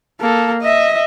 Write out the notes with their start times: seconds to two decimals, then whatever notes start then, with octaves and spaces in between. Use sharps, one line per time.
0.21 A#3 A4
0.62 D#5 E5